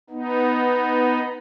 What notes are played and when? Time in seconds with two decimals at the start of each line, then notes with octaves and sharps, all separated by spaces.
0.10 B3 D#4